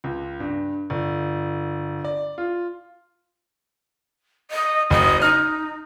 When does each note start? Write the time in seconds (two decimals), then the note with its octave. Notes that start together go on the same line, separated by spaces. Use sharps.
0.04 C#2
0.40 G2
0.90 G1
2.05 D5
2.38 F4
4.51 D#5
4.90 F#1 D#5
5.22 D#4 F6